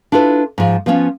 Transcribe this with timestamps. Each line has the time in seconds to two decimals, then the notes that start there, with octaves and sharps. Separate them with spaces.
0.12 D4 E4 F4 A4 B4
0.58 G#2 F3
0.86 F3 B3 C#4 D#4 F4